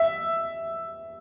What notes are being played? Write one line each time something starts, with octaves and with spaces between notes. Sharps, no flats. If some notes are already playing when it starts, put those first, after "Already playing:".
Already playing: E5